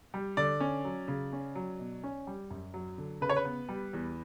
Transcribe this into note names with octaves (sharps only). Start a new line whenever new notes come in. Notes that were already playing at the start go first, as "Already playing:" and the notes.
G3
D3 D5
C#4
F#3
C#3
C#4
F#3
B2
C#4
G3
F#2
F#3
D3
C#3 B4
C#5
B4
B3
G3
E2